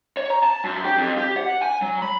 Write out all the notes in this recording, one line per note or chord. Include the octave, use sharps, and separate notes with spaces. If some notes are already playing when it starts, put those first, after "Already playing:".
C#5
A#5
A5
F#2
G4
F2
G4
F#5
G#5
F#3
B5